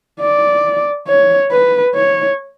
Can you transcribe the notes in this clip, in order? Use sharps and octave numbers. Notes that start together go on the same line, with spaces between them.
D5
C#5
B4
C#5